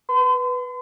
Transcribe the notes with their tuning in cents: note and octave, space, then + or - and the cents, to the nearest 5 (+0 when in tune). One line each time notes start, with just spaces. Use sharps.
B4 +0 C6 -45